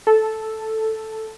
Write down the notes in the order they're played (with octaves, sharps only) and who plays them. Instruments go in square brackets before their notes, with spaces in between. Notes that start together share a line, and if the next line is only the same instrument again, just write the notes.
[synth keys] A4